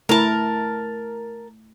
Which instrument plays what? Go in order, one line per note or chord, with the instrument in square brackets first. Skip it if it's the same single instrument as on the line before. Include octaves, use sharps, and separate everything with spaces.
[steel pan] A3 E4 [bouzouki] A#4 A5